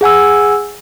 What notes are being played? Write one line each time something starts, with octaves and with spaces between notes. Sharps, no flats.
G#4 F#5 G#5 E6